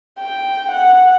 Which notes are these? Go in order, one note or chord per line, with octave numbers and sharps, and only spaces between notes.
G5
F#5